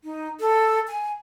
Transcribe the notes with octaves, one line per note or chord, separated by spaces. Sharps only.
D#4
A4
G#5